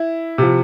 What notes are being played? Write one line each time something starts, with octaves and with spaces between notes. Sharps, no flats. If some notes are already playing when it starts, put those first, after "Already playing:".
Already playing: E4
C3 F3